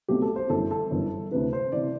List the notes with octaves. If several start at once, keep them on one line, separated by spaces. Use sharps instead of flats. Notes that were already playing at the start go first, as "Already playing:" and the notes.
B1 B2 A3 C4 G4
A4
C5
G1 F#2 E3 A4
A4
G1 F#2 E3
D2 C3 E3 B4
C5
C3 E3 D5